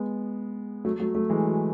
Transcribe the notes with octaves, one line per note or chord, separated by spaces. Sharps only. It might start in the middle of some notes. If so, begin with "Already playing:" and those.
Already playing: G#3 B3
F#3 A3
F#3 A3
F#3 A3
E3 G#3
F#3